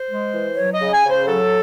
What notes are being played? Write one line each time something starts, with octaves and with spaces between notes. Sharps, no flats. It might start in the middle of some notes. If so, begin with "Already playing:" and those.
Already playing: C5
G#3
E3
F#3 C#5
D#5
C#3
G#5
C#3
C5
F#3 A4